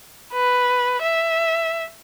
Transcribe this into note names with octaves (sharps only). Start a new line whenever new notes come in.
B4
E5